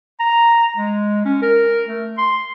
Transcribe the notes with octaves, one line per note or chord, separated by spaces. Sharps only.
A#5
G#3
C#4
A#4
A3
C6